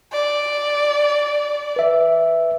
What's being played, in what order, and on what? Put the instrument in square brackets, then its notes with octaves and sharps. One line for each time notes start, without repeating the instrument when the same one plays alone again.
[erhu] D5
[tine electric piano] B4 E5